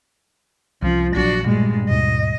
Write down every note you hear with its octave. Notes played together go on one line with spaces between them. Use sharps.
C2 F3 C#4
A#1 F3 F#3 D4 F#4
G2 A#2 G#3 A3
D#2 G#2 B2 D#5